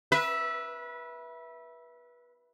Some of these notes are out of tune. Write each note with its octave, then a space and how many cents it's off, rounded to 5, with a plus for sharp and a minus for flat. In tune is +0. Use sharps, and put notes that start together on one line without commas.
B4 -25 E5 +0